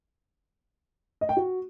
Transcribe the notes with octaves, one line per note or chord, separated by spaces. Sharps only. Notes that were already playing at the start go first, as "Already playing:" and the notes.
D#5
G5
F#4